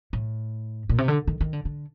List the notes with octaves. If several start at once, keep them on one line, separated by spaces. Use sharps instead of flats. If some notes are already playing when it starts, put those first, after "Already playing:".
A2
A#2
C3
D3
D#3
D#3
D3
D3